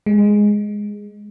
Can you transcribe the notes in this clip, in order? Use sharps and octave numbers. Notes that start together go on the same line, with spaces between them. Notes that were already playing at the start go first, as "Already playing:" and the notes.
G#3